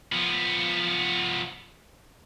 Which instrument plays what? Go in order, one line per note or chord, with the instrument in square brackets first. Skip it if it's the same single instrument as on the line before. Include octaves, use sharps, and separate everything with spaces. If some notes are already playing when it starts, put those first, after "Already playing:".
[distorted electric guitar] F3 B3